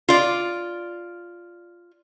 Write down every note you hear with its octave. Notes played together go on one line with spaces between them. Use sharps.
F4 D5